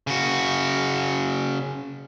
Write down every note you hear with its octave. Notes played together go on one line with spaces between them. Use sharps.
C#3 F#4